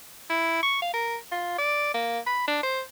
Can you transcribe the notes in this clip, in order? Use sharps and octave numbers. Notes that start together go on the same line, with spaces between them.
E4
C#6
F5
A#4
F4
D5
A#3
B5
D4
C5